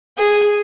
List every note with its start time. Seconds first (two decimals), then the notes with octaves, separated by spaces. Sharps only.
0.17 G#4